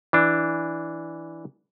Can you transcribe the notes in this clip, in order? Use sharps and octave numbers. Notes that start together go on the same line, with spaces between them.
E3 D4